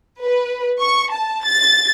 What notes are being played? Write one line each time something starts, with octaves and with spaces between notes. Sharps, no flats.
B4
C#6
A5
A6